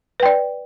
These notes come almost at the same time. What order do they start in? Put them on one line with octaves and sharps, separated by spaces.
B4 G5 D5